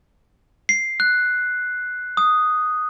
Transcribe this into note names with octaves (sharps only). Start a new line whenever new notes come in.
C7
F#6
D#6